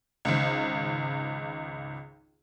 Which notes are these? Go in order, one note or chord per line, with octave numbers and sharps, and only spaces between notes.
G#1 C#2